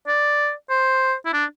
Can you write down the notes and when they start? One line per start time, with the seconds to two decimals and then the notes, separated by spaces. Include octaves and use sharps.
0.07 D5
0.70 C5
1.26 E4
1.33 D4